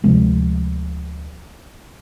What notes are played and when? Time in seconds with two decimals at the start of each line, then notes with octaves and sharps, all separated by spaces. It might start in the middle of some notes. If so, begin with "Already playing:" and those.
0.04 D2 C3 F3 G#3